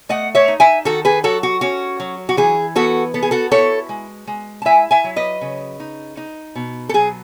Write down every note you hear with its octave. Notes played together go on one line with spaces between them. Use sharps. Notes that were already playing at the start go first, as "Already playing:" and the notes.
A3 D#5 F#5
C#5 E5
D#4
E5 G#5
D#3 F#4 A4
G#4 B4
F#3 F#4 A4
F#4
C#4 F#4
F#3
F#4
E3 G#4
B3 F#4 A4
B3 A4
G#4
F#4 A4
E4 A4 C#5
G#3
G#3
A5
E4 E5 G#5
E5 G#5
F#3
B4 D#5
C#3
D#4
D#4
B2
A4
F#3 G#4